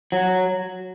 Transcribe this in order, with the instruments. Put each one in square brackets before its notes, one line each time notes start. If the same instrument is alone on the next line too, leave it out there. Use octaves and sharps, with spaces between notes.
[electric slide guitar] F#3